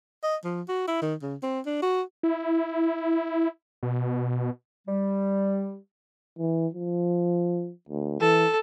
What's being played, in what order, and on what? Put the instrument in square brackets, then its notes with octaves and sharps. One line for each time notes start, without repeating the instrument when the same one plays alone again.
[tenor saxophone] D#5
F3
F#4
E4
D#3
C#3
C4
D4
F#4
[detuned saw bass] E4
B2
[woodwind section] G3
[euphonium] E3
F3
D2
[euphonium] E3 [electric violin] A4